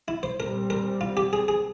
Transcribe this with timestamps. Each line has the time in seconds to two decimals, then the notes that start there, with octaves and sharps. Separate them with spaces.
0.08 E4
0.23 C5
0.40 A#2 G3 C4 A#4
0.70 A#4
1.01 F4
1.17 G4
1.33 G#4
1.48 G#4